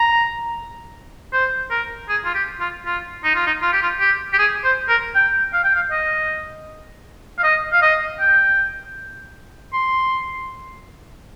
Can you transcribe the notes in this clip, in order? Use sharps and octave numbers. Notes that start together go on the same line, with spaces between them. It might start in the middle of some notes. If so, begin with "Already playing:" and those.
Already playing: A#5
C5
A#4
G#4
F4
G4
F4
F4
D#4
F4
D#4
F4
G4
F4
G4
G4
G#4
C5
A#4
G5
F5
G5
F5
D#5
F5
D#5
F5
D#5
G5
C6